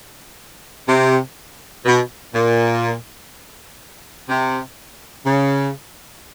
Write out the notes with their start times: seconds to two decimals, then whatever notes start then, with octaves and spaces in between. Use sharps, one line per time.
0.87 C3
1.85 B2
2.33 A#2
4.29 C3
5.25 C#3